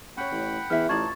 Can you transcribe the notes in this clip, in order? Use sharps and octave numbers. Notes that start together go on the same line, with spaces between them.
C#4 C#5 F#5 G5 B5
A1
E2 E4 E5 F6
A1 D#4 F4 D5 A5 C#6 G#6 A6